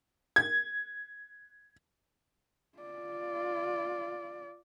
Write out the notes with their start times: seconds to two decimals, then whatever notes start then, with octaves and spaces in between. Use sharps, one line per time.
0.36 G#6
2.79 F4 D5